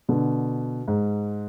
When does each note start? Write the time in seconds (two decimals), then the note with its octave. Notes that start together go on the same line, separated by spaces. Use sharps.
0.09 B2 D3
0.88 G#2